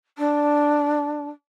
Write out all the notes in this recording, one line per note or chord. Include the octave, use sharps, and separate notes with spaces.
D4